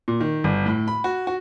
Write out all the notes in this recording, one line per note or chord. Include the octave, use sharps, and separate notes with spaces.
A#2
D#3
G1
A2
B5
F#4
F#4